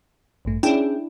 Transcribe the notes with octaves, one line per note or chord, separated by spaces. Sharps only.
A1 G2 A3
C#4 D4 E4 G#4 G5